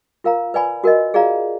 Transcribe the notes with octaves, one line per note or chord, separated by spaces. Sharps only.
F4 A#4 F5 A#5
B4 D5 G#5 B5
F#4 A#4 D#5
F4 G#4 D5 F5 A#5